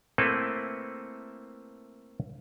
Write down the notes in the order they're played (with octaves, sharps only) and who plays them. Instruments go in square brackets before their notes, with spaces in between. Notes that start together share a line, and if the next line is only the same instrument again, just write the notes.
[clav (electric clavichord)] A3 A#3 C4 E4 A4 B4